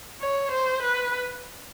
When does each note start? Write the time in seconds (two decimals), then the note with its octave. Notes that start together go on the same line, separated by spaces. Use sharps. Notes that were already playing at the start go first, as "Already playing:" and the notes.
0.20 C#5
0.51 C5
0.83 B4